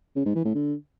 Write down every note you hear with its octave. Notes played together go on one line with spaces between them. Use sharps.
C#3
G#2
E3
A2
D3